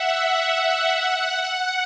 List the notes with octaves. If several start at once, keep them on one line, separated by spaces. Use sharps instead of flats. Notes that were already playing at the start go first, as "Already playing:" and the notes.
Already playing: E5 F#5
F#5
F#5